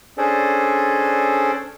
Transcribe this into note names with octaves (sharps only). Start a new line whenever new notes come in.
C#4 D4 G#4 A4 C5 D5